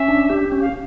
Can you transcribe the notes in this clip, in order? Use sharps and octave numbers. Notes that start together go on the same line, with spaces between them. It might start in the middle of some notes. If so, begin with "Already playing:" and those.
Already playing: C#4 E5
D4
G4
C#4
F5